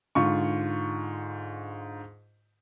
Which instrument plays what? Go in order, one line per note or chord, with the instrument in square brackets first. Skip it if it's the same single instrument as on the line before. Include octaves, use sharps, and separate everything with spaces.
[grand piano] G#2 D3 F4 C#6